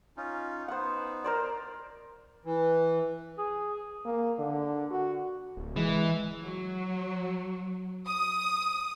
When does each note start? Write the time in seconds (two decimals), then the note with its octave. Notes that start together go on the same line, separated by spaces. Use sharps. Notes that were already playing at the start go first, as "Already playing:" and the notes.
0.17 C#4 D#4 F4
0.68 B3 D#4 C5 F#5
1.24 A#4 C5 D5
2.45 E3
3.38 G#4
4.05 A#3
4.39 D3
4.91 F#4
5.57 D1
5.76 E3 G#3
6.41 F#3
8.08 D#6